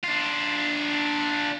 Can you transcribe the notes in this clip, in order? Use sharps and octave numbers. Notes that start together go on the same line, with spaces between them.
D4 F4